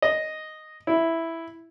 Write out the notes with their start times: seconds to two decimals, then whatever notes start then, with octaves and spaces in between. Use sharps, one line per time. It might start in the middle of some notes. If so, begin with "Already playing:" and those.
0.02 D#5
0.87 E4